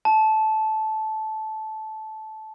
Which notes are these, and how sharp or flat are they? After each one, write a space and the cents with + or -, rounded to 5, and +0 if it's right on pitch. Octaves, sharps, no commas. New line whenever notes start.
A5 -15